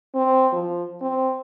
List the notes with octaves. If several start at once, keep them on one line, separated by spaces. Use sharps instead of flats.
C4
F3
C4